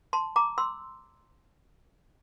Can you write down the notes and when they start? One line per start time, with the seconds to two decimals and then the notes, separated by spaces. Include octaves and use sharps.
0.13 A5 C6
0.36 A#5 D6
0.58 C6 E6